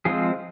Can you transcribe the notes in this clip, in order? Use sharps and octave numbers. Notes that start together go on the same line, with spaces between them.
F3 G#3 C4 F4 G#4